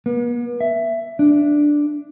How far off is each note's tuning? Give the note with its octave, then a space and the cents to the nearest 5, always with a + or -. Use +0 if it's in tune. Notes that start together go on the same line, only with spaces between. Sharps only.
B3 -45
E5 +15
D4 +0